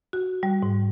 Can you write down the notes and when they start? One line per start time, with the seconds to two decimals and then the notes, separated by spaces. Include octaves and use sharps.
0.13 F#4
0.43 G3
0.63 G#2